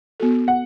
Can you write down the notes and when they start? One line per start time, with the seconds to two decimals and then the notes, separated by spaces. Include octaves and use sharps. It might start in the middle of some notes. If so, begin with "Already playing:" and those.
0.20 B3 F#4 A4
0.48 F#5